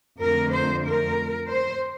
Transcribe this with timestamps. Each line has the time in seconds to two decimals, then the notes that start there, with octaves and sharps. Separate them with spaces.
0.21 F2 D3 A3 A#4
0.53 C5
0.86 A#4
1.52 C5